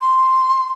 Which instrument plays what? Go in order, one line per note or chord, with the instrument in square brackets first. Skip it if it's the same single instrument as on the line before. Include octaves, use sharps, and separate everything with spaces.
[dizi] C6